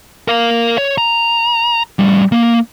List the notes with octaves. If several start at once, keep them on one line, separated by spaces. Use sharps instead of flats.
A#4 F5
C#5
A#5
A2 G3
A#3